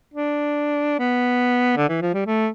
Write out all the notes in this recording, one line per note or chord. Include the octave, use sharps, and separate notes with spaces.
D4
B3
D3
E3
F3
G3
A3